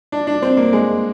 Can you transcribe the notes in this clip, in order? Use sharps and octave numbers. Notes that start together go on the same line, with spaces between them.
D4
D4
C4
A#3
G#3